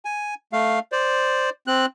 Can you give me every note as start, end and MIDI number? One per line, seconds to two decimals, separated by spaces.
0.05 0.34 80
0.53 0.79 57
0.53 0.79 77
0.92 1.50 72
0.92 1.50 74
1.67 1.86 60
1.67 1.86 90